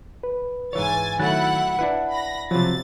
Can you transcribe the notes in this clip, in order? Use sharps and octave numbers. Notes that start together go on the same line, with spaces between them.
B4
G#2 E3 C#5 G#5 A6
D#3 F#3 A3 E4 F#5 F#6 A6
D4 E4 B4 F#5
B5 A#6
C3 F3 F#3 A6